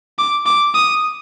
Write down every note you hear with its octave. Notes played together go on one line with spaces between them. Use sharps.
D6
D6
D#6